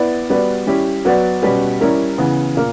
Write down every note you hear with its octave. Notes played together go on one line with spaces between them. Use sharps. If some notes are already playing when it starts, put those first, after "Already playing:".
Already playing: B3 E4 B4 D5
G3 B3 F#4 B4 D5
G3 C#4 E4 G4
F#3 B3 F#4 B4 D5
B2 G3 C#4 G4 B4
G3 C#4 E4 A#4
C#3 E3 B3
A#2 A#3